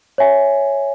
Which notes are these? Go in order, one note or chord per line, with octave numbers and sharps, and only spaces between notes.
C#5 E5 G#5